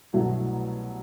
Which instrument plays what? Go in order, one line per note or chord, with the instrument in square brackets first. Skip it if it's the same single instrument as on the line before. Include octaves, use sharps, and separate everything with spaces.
[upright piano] C2 B2 F#3 A3